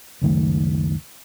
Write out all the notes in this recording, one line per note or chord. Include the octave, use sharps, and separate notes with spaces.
C#2 F#2 D#3 A3